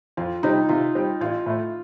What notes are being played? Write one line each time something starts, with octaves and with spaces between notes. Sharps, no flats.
F2 F4
C3 G3 C4 D#4 G4
C3 F4
G3 C4 G4
A1 F4
A2 A3